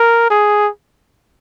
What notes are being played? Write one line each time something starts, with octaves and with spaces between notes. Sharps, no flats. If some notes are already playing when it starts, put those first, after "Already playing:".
Already playing: A#4
G#4